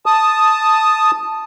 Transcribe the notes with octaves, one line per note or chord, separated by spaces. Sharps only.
A5 D#6